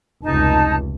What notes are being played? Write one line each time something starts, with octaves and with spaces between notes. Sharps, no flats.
F1 C#2 D#4 A5